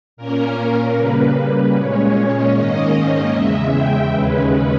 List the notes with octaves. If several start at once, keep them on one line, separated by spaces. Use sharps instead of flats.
A#2 A#3 C#4 A#4
C#3 G3 A#3 B4
B4
A#2 G#3 C#4 C#5
G#2 D#3 A#3 C#4 D#5
E2 C#3 G#3 E5
G5
D#2 C#3 G#3 C#4 B4